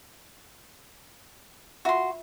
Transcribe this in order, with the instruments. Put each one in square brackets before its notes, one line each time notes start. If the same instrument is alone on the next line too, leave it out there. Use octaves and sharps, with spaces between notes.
[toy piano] F4 E5 E6 [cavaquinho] F#4 C6